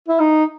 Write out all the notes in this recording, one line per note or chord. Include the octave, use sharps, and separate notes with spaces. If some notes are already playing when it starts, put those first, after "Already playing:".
E4
D#4